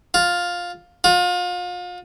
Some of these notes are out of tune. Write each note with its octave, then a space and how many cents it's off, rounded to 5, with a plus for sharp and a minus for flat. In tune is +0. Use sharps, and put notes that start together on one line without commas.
F4 +10
F4 +35